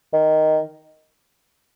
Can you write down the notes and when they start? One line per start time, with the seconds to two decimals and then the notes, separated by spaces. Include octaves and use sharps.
0.13 D#3